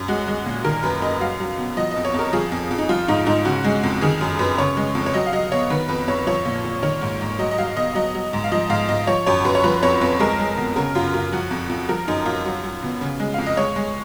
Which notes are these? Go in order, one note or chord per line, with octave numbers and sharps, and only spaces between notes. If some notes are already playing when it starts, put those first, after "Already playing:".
Already playing: F#2
G#3 F#4
G#3
A#2
D#3 A#4
F#2 B4
F#2 D#5
F#3 F5
F#3
B2
F3 D#5
F2 D#5
C#5
F2 A#4
F3 G#4
F2
F2
D#4
F3 F4
G#2 D#4
G#2 D#4
C#3 F#4
G#3
F2
D#3 G#4
F#2
F#2 B4
C#3 C#5
G#3
F2
C#5
F#3 D#5
F5
F#3 D#5
B2 C#5
D#3 B4
F2 B4
F2 C#5
F3 C#5
A#2
A#2
D#3 C#5
G#2
G#2
F#3 D#5
D#5
F#3 F5
B2 D#5
F#3 D#5
F#3
G#2
F5
F3 D#5
G#2 F5
G#2 D#5
F3 C#5
F#2 C#5
F#2 B4
C#5
F3 B4
F2 C#5
F2 B4
G#3 A#4
G#3
B2
C#3 A#4
F#2 F4
F#2 F4
F3 F#4
F2
F2
F3 A#4
F#2 D#4
F#2 F4
F#3
F#3
B2
C#3
G#3
F2 F5
D#5
G#3 C#5
G#3